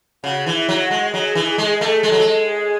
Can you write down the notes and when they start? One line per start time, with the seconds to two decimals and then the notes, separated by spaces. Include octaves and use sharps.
0.24 C#3 F#4
0.46 E3
0.53 E4
0.69 F#3
0.84 F#4
0.91 G#3
1.14 F#3 G#4
1.35 E3
1.58 G#3
1.81 A3
2.03 G#3 A4
2.12 F#3
2.20 G#3
2.48 G#4